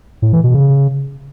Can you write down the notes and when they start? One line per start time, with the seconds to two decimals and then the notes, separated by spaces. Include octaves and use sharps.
0.22 A2
0.33 E3
0.44 B2
0.54 C#3